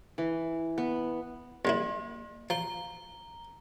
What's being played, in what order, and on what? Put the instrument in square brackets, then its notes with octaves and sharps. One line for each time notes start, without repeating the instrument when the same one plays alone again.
[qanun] E3
B3
[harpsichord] C2 F#3 E4 [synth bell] A#3
[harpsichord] F3 [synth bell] A#5 G7